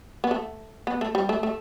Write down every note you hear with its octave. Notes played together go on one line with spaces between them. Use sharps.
B3
A3
B3
A3
G3
A3
A3